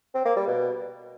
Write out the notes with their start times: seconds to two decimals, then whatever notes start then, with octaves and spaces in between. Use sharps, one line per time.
0.14 C4
0.25 A#3
0.36 G3
0.47 B2